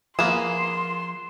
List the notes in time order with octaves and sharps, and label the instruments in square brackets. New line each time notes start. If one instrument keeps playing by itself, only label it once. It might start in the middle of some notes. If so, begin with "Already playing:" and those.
[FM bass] F3 [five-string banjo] A#3 B3 G#4 [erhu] C6 [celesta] E7